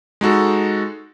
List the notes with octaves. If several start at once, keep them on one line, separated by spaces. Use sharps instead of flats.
G#3 D#4 F#4 A4